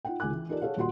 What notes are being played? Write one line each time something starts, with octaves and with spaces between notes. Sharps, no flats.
D#4 F4 F#5 G5
C#2 D#3 G#5 D6 F#6
E3
D#4 F4 G4 A4 A#4 D5
G#4 A4 C#5 F5 F#5
D#1 A#2 F4 F#4 F#5 C6